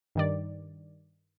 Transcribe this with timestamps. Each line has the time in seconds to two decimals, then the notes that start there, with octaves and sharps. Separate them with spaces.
0.15 G2 D#3 D5